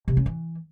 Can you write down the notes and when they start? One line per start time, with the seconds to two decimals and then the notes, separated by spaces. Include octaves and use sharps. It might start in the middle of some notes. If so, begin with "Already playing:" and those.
0.08 C3
0.17 C#4
0.26 E3